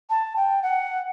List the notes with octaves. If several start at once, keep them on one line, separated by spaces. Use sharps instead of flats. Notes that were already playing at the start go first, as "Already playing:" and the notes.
A5
G5
F#5